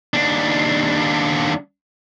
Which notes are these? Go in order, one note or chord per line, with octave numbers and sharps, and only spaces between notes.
D#2 D4